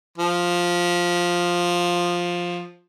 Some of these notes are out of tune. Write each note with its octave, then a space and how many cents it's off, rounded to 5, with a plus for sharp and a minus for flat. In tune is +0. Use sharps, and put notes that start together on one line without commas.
F3 +5